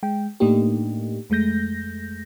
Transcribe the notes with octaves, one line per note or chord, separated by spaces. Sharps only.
G#3 G5
A2 A3 A#3 D4 D#4 G4
F2 G#3 A3 G6 A#6